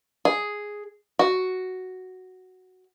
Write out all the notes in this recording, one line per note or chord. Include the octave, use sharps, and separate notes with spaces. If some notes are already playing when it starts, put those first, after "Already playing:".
G#4
F#4